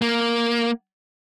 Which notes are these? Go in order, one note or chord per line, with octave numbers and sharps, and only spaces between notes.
A#3